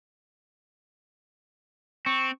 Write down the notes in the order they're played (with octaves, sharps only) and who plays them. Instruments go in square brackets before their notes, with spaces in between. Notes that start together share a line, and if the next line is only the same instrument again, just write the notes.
[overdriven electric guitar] C4 [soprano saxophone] C#6